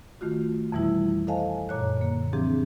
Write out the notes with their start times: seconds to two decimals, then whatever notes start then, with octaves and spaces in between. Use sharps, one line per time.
0.21 D#3 A3 F4 F#4
0.72 F2 B2 E3 G3 E4
1.27 A4 C5 D#5 F5 G#5 A5
1.69 F#2 A#2 C#5 F#6
1.97 D3 A#3
2.33 E3 F3 C4 D4 G4 G#4